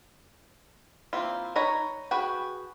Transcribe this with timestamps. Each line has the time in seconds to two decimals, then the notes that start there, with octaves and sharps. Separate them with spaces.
1.13 A#3 C4 E4 F4
1.56 D#4 B4 C#5 A#5
2.11 F#4 G#4 B4 G5